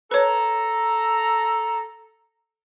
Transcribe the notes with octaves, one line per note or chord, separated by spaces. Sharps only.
A4 B4 C#5 A#5